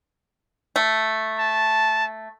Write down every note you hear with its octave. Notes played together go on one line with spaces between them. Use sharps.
A3
A5